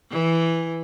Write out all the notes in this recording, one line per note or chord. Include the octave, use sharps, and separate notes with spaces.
E3